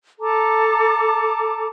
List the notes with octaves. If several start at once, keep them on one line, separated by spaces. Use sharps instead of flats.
A4 A5 A#5 D6